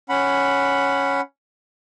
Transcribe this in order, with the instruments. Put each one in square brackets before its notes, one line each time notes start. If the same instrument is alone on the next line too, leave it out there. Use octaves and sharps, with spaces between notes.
[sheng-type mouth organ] C#4 F#5 B5